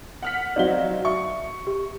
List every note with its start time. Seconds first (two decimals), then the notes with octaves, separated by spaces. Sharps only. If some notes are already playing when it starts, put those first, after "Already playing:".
0.22 F#5 F6 B6
0.56 F#3 C4 D#4 D5 F5 G7
1.05 E5 C#6
1.67 G4